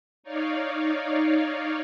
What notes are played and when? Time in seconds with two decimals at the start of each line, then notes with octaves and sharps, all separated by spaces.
0.23 D#4 C#5 D5 F5